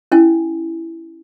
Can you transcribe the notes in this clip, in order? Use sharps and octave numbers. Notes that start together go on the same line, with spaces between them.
C#4 E4 G#5